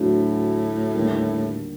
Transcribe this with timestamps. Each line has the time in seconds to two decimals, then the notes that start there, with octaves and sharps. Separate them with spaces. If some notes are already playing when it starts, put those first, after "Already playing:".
Already playing: D2 A2 D3 F#3
0.95 D#2 D3 G3 A#3